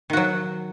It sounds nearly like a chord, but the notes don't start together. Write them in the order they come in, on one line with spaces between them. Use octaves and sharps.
D#3 F#4 F#3